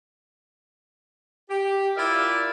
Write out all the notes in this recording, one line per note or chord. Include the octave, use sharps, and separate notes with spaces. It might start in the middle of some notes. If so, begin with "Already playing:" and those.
G4
E4 F4 A#4 D5 E5